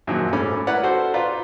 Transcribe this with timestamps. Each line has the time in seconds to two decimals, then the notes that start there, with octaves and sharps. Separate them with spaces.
0.07 F#2 A#2 D#3 F3 F#3
0.33 G#2 A3 C#4 B5 D6
0.67 E4 A#4 B4 C#5 D5 F#5
0.83 F#4 A4 C5
1.14 F4 B4 D5 A#5